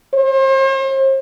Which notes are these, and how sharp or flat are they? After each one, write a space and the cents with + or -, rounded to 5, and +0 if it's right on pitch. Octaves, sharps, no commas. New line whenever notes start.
C5 +40